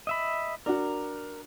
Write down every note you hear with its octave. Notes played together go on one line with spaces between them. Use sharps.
D#5 E5 B5
D4 F#4 A#4